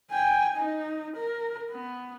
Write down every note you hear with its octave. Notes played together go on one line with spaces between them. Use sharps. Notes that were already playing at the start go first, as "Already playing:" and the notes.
G5 G#5
D#4
A#4
B3